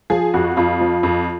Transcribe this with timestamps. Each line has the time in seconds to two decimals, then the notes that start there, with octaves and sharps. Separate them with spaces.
0.10 F3 G#4
0.34 F2 F#4
0.57 F2 F4
0.80 F3
1.03 F2